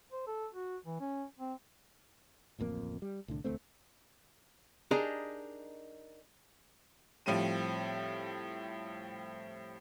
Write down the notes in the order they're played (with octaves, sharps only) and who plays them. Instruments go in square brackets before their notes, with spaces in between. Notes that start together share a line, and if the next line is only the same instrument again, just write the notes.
[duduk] C5
A4
F#4
E3
C#4
C4
[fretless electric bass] D1 A1 F2 A#3
G3
C2 A2 D3
E1 D2 A3 C4
[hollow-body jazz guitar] D4 D#4 G4 G#4 A#4
[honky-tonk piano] A2 F3 G3 C4 D#7